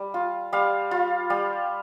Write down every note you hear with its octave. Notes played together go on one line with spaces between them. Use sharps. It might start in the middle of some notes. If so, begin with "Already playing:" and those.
Already playing: G3
F4
G3 F5
F4
G3